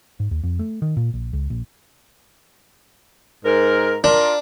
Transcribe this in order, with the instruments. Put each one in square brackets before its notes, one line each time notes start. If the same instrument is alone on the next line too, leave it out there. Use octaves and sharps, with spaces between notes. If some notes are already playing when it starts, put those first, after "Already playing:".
[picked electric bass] G#2
D#2
F2
A3
D#3
A#2
A#1
C#2
A#1
[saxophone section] G#2 A#4
[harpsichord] D4 [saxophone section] F4 A#4